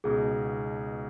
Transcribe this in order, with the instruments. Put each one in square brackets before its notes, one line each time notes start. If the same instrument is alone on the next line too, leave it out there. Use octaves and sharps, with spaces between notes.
[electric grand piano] C#2 B2 B3 D#4 [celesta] G#4